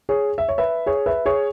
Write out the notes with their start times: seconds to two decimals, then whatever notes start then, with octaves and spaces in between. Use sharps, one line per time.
0.09 G#4 C#5
0.38 E5
0.48 C#5
0.58 B4 E5
0.86 G#4 C#5
1.06 B4 E5
1.26 G#4 C#5